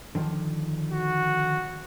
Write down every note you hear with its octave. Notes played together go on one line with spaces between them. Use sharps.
D3 D#3 F3
F#4